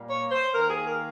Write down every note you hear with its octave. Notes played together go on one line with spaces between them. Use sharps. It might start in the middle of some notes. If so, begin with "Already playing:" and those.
Already playing: A#2 G3 A#3
C#5
C5
D#3 A#3 A#4
G#4
A#4